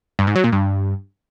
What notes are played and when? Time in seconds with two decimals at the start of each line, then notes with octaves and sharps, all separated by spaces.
0.19 G2
0.27 G#2
0.36 F#3
0.44 A#2
0.52 G2